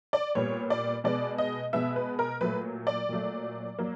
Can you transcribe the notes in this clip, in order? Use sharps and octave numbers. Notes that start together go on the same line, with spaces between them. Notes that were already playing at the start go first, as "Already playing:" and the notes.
D5
A#2 G3 B3 C#5
D5
B2 G#3 B3 D5
D#5
B2 G#3 B3 E5
B4
A#4
A#2 F#3 A3 B4
D5
A#2 F#3 A3
F#3 A#3